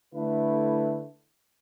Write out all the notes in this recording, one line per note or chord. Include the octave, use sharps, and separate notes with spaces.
D3 A3 E4 B4